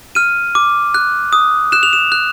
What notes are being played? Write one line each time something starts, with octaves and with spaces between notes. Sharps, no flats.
F6 D#7
D6
F#6
D#6
F#6 E7
F7
E7
F#6